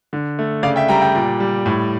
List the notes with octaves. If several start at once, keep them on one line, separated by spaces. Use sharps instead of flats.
D3
A3
C#3 D5 F5
E5 G5
G3 G5 A#5
G5 A#5
A#2
G3
A2